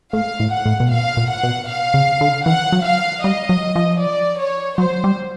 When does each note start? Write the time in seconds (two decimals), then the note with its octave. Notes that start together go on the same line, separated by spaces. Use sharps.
0.13 A2 F5
0.40 A2
0.53 F#5
0.66 A2
0.80 B2
0.92 A#2 F5
1.17 A#2
1.30 F#5
1.43 B2
1.69 F5
1.94 C#3
2.21 D3
2.46 E3 F#5
2.72 F#3
2.85 F5
3.24 G3 D#5
3.49 F#3
3.76 F3
4.01 D5
4.40 C#5
4.78 F#3 C5
5.04 G3